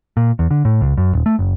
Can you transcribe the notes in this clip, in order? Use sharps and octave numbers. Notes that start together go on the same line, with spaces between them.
A#2
E2
D3
A2
C#2
F#2
D#1
A3
F#1